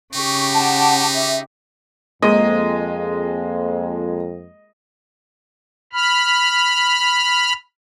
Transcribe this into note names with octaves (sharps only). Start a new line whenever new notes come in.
C#3 D#4 G4 C#6
F#5 A5
E5
F2 G#3 A#3 D#5
B5 F6